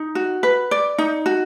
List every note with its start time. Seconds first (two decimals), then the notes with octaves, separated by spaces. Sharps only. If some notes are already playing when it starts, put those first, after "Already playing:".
Already playing: D#4
0.15 F#4
0.43 B4
0.71 D5
0.98 D#4
1.26 F#4